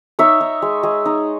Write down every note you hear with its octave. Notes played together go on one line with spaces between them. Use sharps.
D#4 C#5 E5
D#4
G#3
G#3
D#4